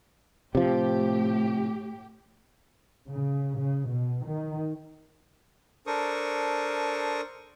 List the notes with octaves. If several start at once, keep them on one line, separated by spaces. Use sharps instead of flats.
A2 C3 F3 G4
C#3
C#3
B2
D#3
D4 A4 A#4 C5 C#6 D#6